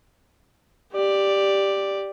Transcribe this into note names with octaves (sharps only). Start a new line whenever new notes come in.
G4 D5